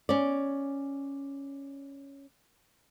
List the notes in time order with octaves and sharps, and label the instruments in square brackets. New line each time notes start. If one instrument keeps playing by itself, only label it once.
[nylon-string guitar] C#4 D5